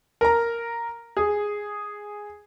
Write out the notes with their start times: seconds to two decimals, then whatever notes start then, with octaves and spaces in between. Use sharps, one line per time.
0.21 A#4 A#5
1.17 G#4